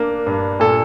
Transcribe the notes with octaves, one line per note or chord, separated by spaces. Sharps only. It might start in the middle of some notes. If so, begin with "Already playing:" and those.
Already playing: A#3 D4
G2
A#2 A4